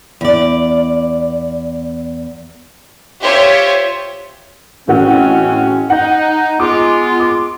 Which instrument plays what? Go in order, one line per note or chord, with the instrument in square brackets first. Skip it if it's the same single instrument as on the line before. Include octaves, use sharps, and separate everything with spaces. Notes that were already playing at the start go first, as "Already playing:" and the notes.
[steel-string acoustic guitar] E2 D5
[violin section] F4 G4 C5 C#5 E5
[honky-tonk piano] A1 F#4 [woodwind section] G#3 C4 C#4
[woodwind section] D#4 [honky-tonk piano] F#5
[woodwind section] G#3 B3 F4 [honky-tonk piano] D6
[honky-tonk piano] D6